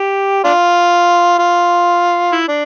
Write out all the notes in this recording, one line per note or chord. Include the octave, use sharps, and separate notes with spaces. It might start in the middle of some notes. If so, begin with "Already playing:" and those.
Already playing: G4
D4 F4
F4
E4
D4